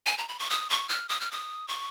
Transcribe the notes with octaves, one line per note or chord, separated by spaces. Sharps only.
G#5
A#5
B5
C#6
D#6
C#6
F6
D#6
F6
D#6
C#6